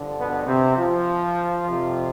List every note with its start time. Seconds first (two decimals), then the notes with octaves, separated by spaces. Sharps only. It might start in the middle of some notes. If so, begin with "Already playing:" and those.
Already playing: G2 D3 F3
0.17 B2 B3
0.47 C3 C4
0.77 F3 F4
1.67 F2 C3 F3